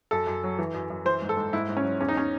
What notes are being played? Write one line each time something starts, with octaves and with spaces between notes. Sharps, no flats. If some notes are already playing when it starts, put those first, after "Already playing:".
F#2 A4
F#2
F#3
E3
F#2
F#2
E3 C5
G#2
A4
G#2
G#2 E4
G#2
C#4
F#3
E2 C#4
D#4
C#4